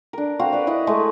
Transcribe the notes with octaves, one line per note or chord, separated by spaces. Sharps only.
D4 A#4
C4 F#4 F5
B4 D5
E4 D5 D#5
G#3 A3 C#6